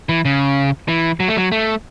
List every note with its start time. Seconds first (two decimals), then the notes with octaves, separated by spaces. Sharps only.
0.09 E3
0.25 C#3
0.88 E3
1.20 F#3
1.28 A3
1.37 F#3
1.52 A3